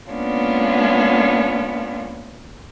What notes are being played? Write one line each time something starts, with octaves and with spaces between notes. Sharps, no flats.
G#3 A#3 B3 C#4 D4 F4